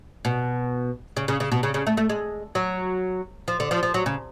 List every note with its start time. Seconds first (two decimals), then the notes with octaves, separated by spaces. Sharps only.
0.25 B2
1.17 C#3
1.28 C#3
1.40 C#3
1.52 B2
1.63 C#3
1.74 C#3
1.87 A3
1.97 A3
2.09 G#3
2.55 F#3
3.48 F3
3.60 D3
3.71 F3
3.83 F3
3.94 F#3
4.06 C#3